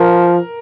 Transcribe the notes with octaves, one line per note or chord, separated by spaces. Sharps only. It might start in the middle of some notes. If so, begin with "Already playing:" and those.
Already playing: F3 A#4